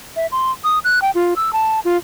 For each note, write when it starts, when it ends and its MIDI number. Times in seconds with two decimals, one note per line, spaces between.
0.16 0.27 76
0.32 0.51 84
0.64 0.79 87
0.84 0.99 90
1.02 1.11 79
1.15 1.34 65
1.36 1.51 88
1.53 1.80 81
1.85 1.97 65